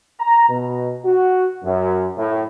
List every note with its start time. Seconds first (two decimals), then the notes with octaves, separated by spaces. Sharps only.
0.19 A#5
0.49 B2
1.05 F#4
1.64 F#2
2.17 A2